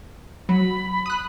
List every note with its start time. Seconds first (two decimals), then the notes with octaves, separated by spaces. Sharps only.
0.49 F#3 B5
1.06 D#6 F#6